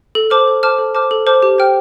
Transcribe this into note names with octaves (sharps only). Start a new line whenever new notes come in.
A4
C5 A5 D6 F6
A4
C5 A5 D6 F6
A4
C5 A5 D6 F6
A4
C5 A5 D6 F6
G4
C5 G5 F6